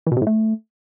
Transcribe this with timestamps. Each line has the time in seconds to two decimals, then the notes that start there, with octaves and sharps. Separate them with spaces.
0.06 E3
0.12 B2
0.17 C3
0.22 A2
0.27 A3